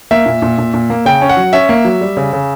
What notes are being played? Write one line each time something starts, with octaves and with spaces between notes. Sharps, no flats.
A#3 E5
A#2
A#2
A#2
A#2
A#3
C#3 G5
C#4
F#5
F#3
C#4 E5
A#3
F#3
G3
C#3
C#3